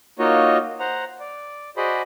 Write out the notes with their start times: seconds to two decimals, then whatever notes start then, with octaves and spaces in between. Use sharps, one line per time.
0.19 A#3 D#4 F4 F#4 C#5 D#5
0.80 C5 F#5 A#5
1.20 D5
1.77 F#4 G#4 C5 D5 D#5 B5